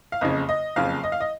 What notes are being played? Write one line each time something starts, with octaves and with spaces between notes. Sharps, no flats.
F5
F#1 F2 C#3 D#5
D#5
F#1 F2 C#3 F5
D#5
F5
D#5